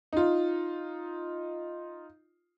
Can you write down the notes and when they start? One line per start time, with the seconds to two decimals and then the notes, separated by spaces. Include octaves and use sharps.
0.13 D#4 F4